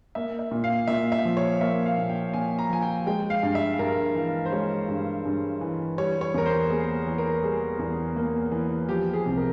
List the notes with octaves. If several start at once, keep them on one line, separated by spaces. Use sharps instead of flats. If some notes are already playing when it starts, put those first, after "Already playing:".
A#3 E5
E5
A#2
F5
A#2 E5
E5
F3
C#5
A#3 E5
F5
A#2
G5
A#2 G#5
A#5
F3 G#5
G5
G#3 G5
F5
G2
E5
G2 A#4
E3
C5
G#3 C#5
G2
G2
E3
G3 C#5
C#5
E2 A#4
C5
A#3 G#4
E3
A#4
G3 G#4
E2
A#3
E3
F3 G4
G#4
C2
A#4